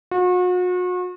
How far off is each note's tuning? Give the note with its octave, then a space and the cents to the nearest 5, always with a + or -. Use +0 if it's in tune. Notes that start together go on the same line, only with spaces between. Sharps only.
F#4 -40